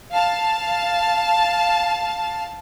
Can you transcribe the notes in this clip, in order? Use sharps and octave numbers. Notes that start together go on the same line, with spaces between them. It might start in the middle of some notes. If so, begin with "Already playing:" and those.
F5 A5